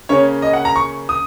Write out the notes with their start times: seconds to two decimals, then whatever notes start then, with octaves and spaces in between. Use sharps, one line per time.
0.09 C#3 A#3 C#4 C#5
0.42 D#5
0.53 F#5
0.65 A#5
0.76 C#6
1.09 D#6